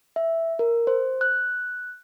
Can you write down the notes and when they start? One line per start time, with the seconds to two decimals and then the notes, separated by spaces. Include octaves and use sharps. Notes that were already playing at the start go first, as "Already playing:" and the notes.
0.16 E5
0.59 A#4
0.87 C5
1.21 F#6